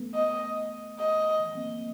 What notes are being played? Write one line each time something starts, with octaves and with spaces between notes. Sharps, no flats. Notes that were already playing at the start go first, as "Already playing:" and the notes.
Already playing: A3 B3
D#5
D#5
A#3 C4